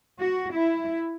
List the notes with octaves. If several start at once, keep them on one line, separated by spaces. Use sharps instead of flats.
F#4
E4